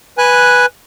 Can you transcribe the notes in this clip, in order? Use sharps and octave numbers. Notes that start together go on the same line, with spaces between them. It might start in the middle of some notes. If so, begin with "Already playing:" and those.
B4 G#5 F#6